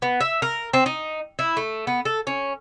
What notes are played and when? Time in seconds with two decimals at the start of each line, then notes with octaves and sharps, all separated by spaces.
0.02 B3
0.20 E5
0.42 A#4
0.74 C4
0.86 D#4
1.39 E4
1.57 A3
1.87 B3
2.05 A4
2.27 C#4